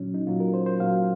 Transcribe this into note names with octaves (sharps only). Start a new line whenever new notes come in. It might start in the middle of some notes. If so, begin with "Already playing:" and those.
Already playing: A#2 F#3 C#4
D#4
A#2 F#3 F4
A#4
C5
C5
A#2 F#3 F5